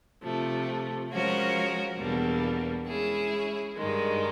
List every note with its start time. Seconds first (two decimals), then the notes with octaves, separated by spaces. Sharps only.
0.23 C3 F3 A3
1.11 F3 G#3 C#4 F#4 A#4
1.99 E2 B2 G3 A#3 D4
2.87 G#3 C#4 E4 G#4
3.76 G2 D#3 G#3